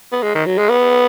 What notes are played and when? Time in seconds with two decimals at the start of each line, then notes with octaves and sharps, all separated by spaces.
0.12 B3
0.23 G#3
0.35 D#3
0.46 F#3
0.58 G#3
0.69 B3